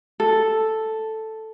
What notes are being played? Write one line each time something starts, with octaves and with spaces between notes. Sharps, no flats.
A4